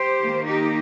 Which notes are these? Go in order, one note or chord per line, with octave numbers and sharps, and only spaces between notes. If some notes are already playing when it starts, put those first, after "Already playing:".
Already playing: G4 C5
D#3 A#3
D#4 G4